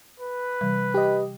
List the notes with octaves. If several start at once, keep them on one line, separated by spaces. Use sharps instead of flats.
B4
C3 E3 G3
G4 D#5